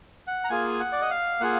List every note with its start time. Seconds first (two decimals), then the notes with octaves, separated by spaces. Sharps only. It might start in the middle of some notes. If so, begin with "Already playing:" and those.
0.27 F#5
0.44 A#5
0.50 A#3 F4 G#4 G#5
0.80 F#5
0.92 D5
1.02 D#5
1.11 F5
1.40 A#3 F4 G#4 F#5